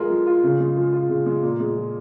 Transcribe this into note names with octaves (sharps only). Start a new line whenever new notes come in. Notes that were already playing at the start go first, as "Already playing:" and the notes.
Already playing: F3 G#3 F4 A#4
F3
F4
C#3
G#3
F3
F4
C#3
G#3
A#2
G#3
F3